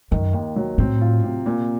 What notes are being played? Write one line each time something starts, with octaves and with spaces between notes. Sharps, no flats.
F#2 D#3
D#2
F#3
A2 C4
F4
C3
A#2